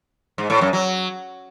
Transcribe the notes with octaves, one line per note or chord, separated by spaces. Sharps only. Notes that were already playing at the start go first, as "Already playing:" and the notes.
G#2
A2
F#2
F#3